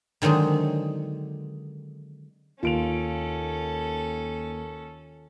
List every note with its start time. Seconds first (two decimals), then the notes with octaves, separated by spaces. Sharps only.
0.22 D3 D#3 F#3 G#3 C4
2.63 D#2 D#3 C#4 F4 A4 D7 F7